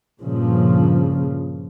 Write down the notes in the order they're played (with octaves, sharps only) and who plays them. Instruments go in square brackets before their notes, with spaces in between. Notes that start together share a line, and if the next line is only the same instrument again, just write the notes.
[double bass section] G2 A#2 C#3 F3